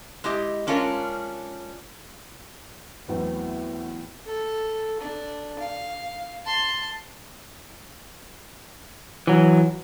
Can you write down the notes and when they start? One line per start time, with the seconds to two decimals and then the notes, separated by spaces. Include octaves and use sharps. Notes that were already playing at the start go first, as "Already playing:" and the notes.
0.24 G#3 E4 G4 D#5
0.67 G#3 C#4 D4 F4 F#4 A#4
3.08 E2 A2 E3 F#3 B3 C4
4.26 A4
5.00 D4
5.59 F5
6.45 A5 C6
9.27 E3 F#3